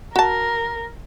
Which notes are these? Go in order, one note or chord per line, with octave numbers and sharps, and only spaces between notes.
F#4 A#4 A5